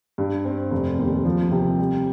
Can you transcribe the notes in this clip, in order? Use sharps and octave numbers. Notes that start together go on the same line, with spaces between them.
G2
C4
F1
D#2
F3
C3
G3